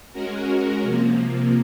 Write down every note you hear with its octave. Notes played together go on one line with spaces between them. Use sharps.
G#3 C#4 F#4 A#4
C3 F3 A#3